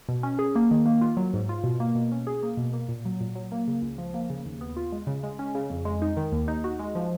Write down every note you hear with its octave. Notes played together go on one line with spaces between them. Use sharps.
B2
C#4
G#4
A#3
D#3
A#3
F4
F#3
G#2
F4
B2
A#3
B2
C#4
G#4
A#3
B2
A#3
A#2
F#3
A#2
F#3
A#3
C#3
C#2
F3
A#3
C#3
D#2
B3
F4
G#3
C#3
G#3
C#4
C#3
F2
G#3
D#4
D#3
D#2
D#4
F#4
G#3
F3